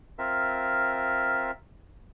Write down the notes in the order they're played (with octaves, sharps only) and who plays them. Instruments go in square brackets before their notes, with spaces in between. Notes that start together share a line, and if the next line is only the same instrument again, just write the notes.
[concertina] C4 F4 A#4 E5